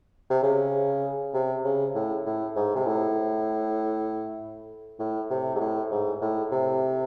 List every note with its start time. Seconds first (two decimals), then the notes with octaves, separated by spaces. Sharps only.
0.30 C3
0.43 C#3
1.33 C3
1.64 C#3
1.95 A2
2.26 A2
2.56 G#2
2.76 C3
2.87 A2
5.00 A2
5.30 C3
5.55 G#2
5.60 A2
5.91 G#2
6.22 A2
6.52 C3